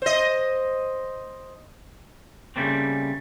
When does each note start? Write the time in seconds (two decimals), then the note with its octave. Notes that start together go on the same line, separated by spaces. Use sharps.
0.02 C5 D#5
2.56 C#3 E3 G3 A3 A#3 C4